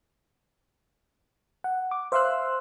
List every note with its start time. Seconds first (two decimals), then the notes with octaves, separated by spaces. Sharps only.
1.64 F#5
1.91 D6
2.12 C5 E5 F5 C6 E6 F#6